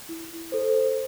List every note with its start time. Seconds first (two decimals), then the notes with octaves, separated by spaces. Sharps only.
0.09 E4
0.52 A4 C5